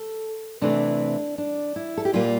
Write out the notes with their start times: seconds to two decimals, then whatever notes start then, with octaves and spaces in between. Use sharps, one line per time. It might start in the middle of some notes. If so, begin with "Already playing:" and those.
Already playing: A4
0.61 C3 E3 A3 C4 D4
1.38 D4
1.76 E4
1.97 A4
2.05 G4
2.13 A#2 G3 A#3 F4